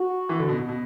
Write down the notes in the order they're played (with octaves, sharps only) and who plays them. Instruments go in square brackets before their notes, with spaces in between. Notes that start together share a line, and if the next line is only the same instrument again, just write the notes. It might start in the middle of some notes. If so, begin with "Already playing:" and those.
Already playing: [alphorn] F#4
[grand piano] E3
D3
B2
B2
B2